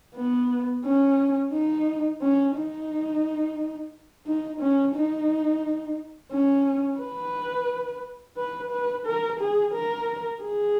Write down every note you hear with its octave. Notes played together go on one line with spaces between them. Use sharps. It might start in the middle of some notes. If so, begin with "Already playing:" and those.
B3
C#4
D#4
C#4
D#4
D#4
C#4
D#4
C#4
B4
B4
B4
A#4
G#4
A#4
G#4